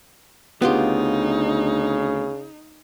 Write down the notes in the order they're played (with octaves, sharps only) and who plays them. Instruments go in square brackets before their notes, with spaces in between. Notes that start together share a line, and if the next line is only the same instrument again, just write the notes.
[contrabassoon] D2 [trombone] C#3 [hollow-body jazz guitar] B3 F4 G4 [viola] D#4